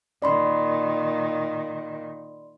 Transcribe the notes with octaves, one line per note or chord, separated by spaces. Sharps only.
A#2 D#3 D5 B5 C6